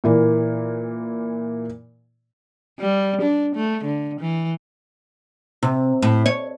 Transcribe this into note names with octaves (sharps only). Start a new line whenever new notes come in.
A#2 E3 A#3
G3
D4
A3
D3
E3
C3
A2
C#5